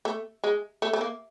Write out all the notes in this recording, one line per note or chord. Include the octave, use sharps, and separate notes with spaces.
A3
G#3
A3
A3
A#3